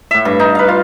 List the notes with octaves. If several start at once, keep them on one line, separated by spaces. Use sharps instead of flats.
A2 E5
G2
D#4
B4 F5
F4